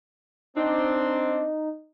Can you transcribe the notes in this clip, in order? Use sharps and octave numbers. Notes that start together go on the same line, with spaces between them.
C4 D4 D#4